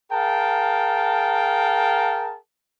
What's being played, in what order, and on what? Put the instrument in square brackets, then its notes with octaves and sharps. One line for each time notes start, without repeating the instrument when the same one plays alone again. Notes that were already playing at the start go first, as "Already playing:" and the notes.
[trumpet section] G#4 A#4 F5 G5 A5